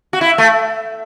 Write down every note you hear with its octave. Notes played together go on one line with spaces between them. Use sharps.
F#4
E4
A3